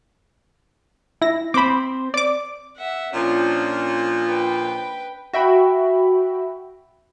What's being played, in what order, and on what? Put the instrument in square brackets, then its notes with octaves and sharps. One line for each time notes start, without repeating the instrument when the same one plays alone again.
[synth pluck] E4 A#6
[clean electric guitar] C4 C5 [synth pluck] B5 D6
[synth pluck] D5 D6
[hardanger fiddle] E5 F#5
[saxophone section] A#2 F3 [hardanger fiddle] C#4 D4
[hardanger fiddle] B4 G5
[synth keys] F#4 E5 G5 B5